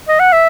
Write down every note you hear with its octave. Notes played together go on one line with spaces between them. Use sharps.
D#5
F#5
E5